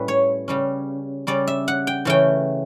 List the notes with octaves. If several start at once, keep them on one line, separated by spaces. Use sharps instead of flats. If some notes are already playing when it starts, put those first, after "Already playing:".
Already playing: A2 G3 C#4 B4
C#5
C#3 G3 C#4
C#3 G3 C#4 D5
E5
F#5
G5
C#3 E3 A3 C#4 G5